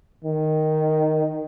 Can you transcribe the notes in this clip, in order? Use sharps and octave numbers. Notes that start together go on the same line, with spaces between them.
D#3